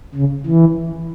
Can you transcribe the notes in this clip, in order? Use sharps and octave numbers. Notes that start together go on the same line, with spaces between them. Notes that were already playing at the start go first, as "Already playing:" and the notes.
C#3
E3